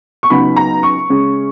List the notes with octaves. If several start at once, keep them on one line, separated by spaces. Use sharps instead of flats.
C#6
C#2 C#3 F#3 B3 D#4 B5
A#5
C#6
C#3 G#3 C#4